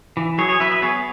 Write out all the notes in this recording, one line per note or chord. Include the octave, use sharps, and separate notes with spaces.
E3
F#3 G#4 C#5
G#4 C#5
F#3 B4 E5
B4 E5
B3 G#4 C#5